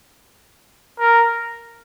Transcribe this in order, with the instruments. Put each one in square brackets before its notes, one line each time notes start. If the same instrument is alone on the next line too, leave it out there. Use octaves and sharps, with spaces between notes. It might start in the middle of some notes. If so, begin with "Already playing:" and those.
[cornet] A#4